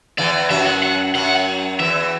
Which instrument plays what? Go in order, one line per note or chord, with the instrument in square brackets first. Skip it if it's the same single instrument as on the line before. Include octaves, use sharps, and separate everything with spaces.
[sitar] E2 E3 [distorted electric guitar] D5
[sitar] F#2 F#3 [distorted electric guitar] E5
[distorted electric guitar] F#5
F#5
[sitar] F#2 F#3 [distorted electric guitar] F#5
[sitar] E2 E3 [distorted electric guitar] E5